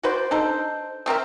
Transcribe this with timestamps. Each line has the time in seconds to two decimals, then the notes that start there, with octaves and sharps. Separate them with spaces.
0.03 F#4 B4 C5 D5
0.31 D4 D#4 A4 C5
1.06 A3 C4 A#4 E5